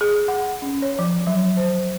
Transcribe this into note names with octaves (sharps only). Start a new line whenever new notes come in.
G#4
F#5
C#4
C#5
F3
F#3
C5